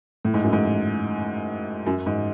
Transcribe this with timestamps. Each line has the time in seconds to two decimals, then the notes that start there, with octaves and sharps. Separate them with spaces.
0.25 A2
0.34 G#2
0.43 F#2
0.53 G#2
1.86 F#2
2.06 G#2